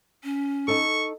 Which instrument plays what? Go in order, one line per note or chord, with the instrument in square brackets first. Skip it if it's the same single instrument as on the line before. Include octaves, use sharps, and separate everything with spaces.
[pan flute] C#4
[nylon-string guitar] D#4 A4 [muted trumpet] C#6